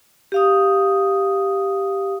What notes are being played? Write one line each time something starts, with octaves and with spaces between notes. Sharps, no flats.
G4 F5 D#6